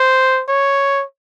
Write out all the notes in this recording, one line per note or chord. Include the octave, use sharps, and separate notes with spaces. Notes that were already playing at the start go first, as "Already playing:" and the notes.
Already playing: C5
C#5